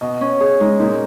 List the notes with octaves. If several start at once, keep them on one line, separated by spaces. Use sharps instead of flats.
B2 D#5
C#4
G#4 C#5
G#3 D#4
A#2 D#4